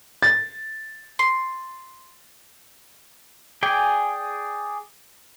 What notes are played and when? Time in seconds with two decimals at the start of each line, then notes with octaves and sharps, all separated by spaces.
0.22 A6
1.19 C6
3.63 G#4 D5 G5 G#5